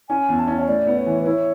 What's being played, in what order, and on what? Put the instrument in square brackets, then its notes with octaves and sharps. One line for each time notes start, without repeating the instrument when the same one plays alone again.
[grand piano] C#4 [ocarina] G#5
[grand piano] E2
[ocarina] A5
[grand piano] C#4
[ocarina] C#5
[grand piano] A2 [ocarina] D5
[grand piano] B3
[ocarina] C#5
[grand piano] E3
[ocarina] B4
[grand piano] E4 [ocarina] C#5